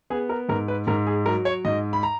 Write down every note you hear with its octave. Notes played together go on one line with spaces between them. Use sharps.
B3 G#4
A#4
G#2 A#4
B4
G#2 A#4
G#4
F#3 A#4
C#5
G#2 D#5
B5
A#5